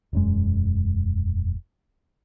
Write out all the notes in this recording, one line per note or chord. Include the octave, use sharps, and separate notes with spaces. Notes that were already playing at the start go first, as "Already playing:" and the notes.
E1 F#2 G#3